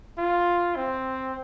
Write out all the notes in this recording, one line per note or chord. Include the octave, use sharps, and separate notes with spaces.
F4
C4